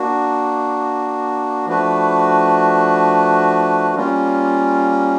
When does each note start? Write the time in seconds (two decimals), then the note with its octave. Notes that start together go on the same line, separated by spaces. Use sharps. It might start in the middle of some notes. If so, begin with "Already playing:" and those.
Already playing: A#3 D4 F#4
1.67 F3 A3 D4 F#4 B4
3.95 G3 A#3 C#4 F4